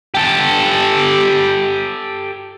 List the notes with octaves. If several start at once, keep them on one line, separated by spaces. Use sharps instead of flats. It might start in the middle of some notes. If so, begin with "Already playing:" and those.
G4 A4